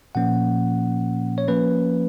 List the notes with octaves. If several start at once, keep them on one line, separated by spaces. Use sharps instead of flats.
A#2 F3 A#3 C#4 F#5
C#5
F3 A#3 C#4 B4